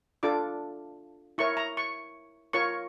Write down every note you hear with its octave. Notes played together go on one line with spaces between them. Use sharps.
D4 F4 A4 D6
E4 A#4 C#5 C#6
A#5
C#6
F4 A#4 C#5 C#6